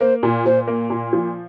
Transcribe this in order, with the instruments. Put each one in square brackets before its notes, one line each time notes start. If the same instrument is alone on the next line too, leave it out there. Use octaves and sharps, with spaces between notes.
[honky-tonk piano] A#3 [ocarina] C5
[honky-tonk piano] A#2
[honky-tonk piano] A#2 [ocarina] C5
[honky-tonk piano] A#3
A#2
F3